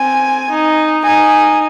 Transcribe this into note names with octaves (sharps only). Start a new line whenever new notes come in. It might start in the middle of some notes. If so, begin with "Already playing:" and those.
Already playing: C4 G#5
D#4
D#4 G#5